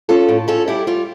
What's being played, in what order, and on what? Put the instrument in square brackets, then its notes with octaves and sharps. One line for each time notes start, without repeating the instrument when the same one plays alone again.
[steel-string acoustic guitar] C#4 F4 A4
A2
C#4 F4 A4
G3 E4 G4
G3 F4